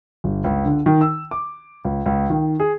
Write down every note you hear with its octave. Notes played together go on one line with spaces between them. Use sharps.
G1
C#2
D3
D#3
E6
D6
C#2
C#2
D#3
G#4